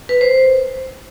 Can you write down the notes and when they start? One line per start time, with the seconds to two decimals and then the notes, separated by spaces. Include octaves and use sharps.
0.09 B4
0.21 C5